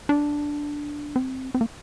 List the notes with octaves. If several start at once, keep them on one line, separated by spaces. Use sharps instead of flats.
D4
C4
C4
A#3